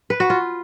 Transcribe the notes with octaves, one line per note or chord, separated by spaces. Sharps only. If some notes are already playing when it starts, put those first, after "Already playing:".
B4
F#4
F4